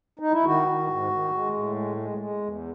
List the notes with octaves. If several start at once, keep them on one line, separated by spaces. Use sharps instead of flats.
D#4
E4
D#3 F#4
D#3
G#2
D#3
G#3
A2
G#3
G#3
G#3
E2